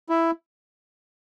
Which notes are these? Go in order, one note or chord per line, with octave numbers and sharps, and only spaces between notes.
E4